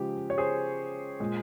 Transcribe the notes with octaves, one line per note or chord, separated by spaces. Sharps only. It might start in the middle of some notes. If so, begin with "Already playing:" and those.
Already playing: C#3 F3 G#3 G4
C#5
G#4 C5
A#2 G#3